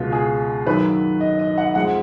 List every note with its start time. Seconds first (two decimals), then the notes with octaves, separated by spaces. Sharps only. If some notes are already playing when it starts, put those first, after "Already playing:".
Already playing: C#2 B2 G#3 F4
0.12 G#4
0.67 F#2 D#3 F#3 B4
1.20 D#5
1.39 D#5
1.58 F#5
1.75 F2 F3 G#3 F#5